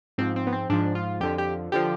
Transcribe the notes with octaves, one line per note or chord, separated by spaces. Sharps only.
G#2 F3 C4
C4
B3
C4
G#2 F3 D4
F4
F2 D3 F3 G4
G4
D3 F3 G4